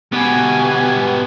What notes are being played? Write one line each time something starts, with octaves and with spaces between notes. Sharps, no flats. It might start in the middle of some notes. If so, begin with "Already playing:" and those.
B2 B3 G4 G#5